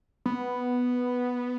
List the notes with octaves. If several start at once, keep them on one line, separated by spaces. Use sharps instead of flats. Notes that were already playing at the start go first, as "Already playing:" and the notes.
B3